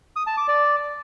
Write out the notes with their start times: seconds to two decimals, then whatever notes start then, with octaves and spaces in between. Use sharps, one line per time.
0.16 D#6
0.27 A5
0.37 D6
0.48 D5